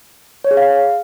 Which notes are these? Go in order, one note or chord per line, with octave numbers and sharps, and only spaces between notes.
C#5
G#4
F5